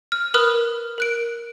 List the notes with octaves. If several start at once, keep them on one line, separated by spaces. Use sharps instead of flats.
F6
A#4 B4 B5 D#6 F6 F#6
A#4 F#6 D7